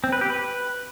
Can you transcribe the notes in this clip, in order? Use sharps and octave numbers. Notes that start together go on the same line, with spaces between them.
C4
B4
G4
B4